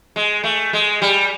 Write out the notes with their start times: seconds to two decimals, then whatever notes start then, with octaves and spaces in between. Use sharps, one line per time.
0.16 G#3
0.44 A3
0.73 G#3
1.02 G3